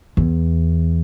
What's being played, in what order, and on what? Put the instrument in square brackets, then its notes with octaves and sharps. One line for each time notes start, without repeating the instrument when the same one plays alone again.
[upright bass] E2